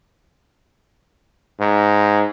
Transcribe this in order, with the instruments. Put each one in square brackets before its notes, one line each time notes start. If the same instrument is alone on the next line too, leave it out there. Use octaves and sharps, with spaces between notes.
[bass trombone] G#2